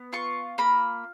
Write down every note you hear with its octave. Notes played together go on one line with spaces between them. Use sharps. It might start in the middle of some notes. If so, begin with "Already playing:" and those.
Already playing: B3
F4 C#6
A#3 B5